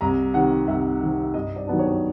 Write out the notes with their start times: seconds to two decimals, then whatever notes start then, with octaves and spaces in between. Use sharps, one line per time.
0.01 C2 A#5
0.34 C3 D#3 F#5
0.67 C2 E5
1.01 C3 D#3
1.34 G2 D#5
1.56 D5
1.67 D#3 F#3 B3 D4
1.79 C#5